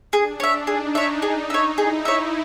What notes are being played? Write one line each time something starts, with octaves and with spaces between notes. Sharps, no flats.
D4 G#4
C#5 E5
D#4 G#4
C#5 E5
G#4
C#5 E5
E4 G#4
C#5 E5